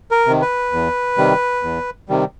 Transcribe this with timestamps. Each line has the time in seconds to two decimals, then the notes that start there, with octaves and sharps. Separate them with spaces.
0.11 A#4
0.26 C3 D#3
0.41 B4
0.72 E2
1.18 C3 D#3 G3
1.63 E2
2.09 C3 D#3 G3